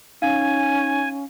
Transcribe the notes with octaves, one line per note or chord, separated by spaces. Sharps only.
C#4 D#4 F5 G#5